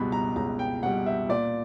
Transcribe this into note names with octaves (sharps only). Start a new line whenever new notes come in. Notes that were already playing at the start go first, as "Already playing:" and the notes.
Already playing: C#2 B2 G3 B5
A#5
C#2 A#5
G5
B2 G3 F#5
E5
A#2 D5